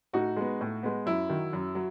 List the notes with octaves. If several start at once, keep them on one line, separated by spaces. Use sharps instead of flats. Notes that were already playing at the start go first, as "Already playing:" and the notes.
A2 D#4 F#4
G#3 B3
A2
G#3 B3
F#2 E4
D#3 F#3
F#2
F#3